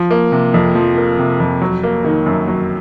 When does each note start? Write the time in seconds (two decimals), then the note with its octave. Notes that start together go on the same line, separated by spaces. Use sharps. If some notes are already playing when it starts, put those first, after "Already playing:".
Already playing: F3
0.11 A#3
0.32 C3
0.54 F2
0.75 F3
0.97 A#3
1.19 C3
1.40 F2
1.62 F#3
1.83 A#3
2.05 D#3
2.26 F#2
2.48 F#3